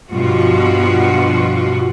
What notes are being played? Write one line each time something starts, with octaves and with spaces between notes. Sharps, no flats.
G2 B2 F3 F4 F#4